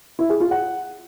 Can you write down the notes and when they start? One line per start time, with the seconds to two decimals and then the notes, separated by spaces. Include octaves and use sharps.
0.19 E4
0.30 G#4
0.40 F4
0.51 F#5